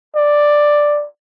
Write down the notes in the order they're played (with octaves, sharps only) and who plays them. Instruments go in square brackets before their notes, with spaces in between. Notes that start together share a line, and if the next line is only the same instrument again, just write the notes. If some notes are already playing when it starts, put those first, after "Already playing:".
[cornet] D5